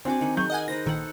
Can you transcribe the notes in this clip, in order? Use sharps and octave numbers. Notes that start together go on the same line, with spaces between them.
C4 D4 F#4 G#5 D6
D#3 F#4
F#3 G#4 C#6 G6
A#4 D#5 F#5 G#5
D#4 B4 C5 A#6
A#1 D#3 A4 F#5